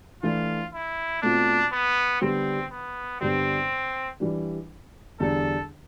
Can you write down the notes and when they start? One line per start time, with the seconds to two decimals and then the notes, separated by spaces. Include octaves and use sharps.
0.23 E3 A3 D4 F4
0.72 E4
1.22 B2 A3 C4 D4 F4
1.72 B3
2.21 D3 G3 B3 C4
2.71 B3
3.20 G2 D3 G3 B3 C4
4.20 E3 G3 D4
5.20 E2 D3 G3 D4 A4